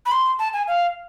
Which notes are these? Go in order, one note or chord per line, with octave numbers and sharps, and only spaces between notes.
B5
C6
A5
G#5
F5